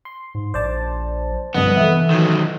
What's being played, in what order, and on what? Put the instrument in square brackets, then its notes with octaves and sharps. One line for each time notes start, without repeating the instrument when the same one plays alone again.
[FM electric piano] C6
[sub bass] G#2
[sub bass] A#1 [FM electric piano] C5 D5 A5
[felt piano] G1 C2 G2 [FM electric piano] C3 D#5 D#6 [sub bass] F3 [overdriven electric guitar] B3
[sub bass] E3 [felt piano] A4 E5
[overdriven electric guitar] D#3 F#3